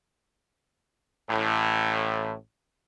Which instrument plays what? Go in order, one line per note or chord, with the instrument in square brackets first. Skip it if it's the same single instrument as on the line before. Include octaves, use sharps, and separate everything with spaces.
[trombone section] A1 A2